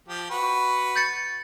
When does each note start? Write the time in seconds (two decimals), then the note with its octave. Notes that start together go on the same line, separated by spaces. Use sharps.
0.08 F3 G4
0.30 F#4 B4
0.96 G6 A6 C#7